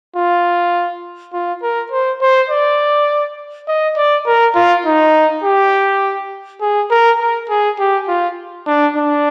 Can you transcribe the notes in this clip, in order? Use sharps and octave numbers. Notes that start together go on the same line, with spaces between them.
F4
F4
A#4
C5
C5
D5
D#5
D5
A#4
F4
D#4
G4
G#4
A#4
A#4
G#4
G4
F4
D4
D4